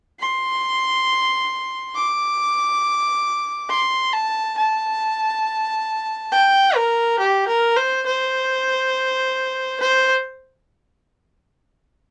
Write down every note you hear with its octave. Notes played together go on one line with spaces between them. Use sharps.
C6
D6
C6
A5
A5
G5
A#4
G4
A#4
C5
C5
C5